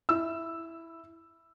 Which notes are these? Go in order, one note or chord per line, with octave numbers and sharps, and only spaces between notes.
E4 E6